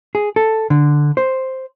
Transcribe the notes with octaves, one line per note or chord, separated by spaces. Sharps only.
G#4
A4
D3
C5